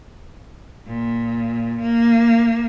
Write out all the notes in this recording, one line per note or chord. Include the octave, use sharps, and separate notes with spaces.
A#2
A#3